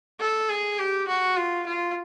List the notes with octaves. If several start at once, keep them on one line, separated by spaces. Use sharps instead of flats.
A4
G#4
G4
F#4
F4
F4